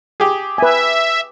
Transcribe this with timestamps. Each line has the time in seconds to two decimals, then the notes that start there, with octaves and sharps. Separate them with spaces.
0.20 G4 G#4
0.58 B4 E5 G#5